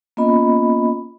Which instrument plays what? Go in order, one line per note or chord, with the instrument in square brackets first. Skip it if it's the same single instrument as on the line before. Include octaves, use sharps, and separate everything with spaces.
[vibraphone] A#3 B3 C#4 F4 D#5 B5